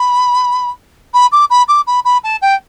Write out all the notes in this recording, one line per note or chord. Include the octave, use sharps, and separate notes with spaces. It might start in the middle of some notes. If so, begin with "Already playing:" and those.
Already playing: B5
B5
D6
B5
D6
B5
B5
A5
G5